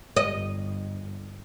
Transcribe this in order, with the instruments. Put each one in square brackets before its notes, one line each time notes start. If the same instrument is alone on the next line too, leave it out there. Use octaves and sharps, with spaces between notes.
[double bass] G1 [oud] D#5